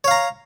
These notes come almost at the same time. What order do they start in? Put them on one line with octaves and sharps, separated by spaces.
C#5 F5 A#5